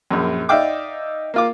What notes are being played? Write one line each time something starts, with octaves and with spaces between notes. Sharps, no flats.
A#1 F#2
D#4 D5 E5 F5 G5 D6
A#3 F4 D6